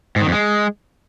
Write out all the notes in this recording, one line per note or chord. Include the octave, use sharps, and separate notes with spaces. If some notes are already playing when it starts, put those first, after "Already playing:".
G#2
D#3
F2
G#3